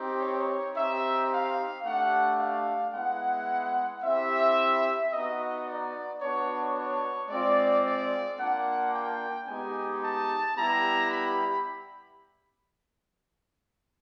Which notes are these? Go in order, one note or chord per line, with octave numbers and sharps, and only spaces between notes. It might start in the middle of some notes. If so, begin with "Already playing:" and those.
Already playing: C4 D#4 G4
C#5
C4 D#4 G4 E5
F5
A3 D4 G4 F#5
F5
G#3 B3 E4 F#5
C4 E4 G4 E5
B3 D#4 F#4 D#5
D5
B3 D4 F#4 C#5
C#5
G#3 C4 F4 D5
D5
A#3 D4 F4 F#5
G5
G#3 B3 D#4 G4 G#5
A5
G3 B3 E4 G4 A#5
B5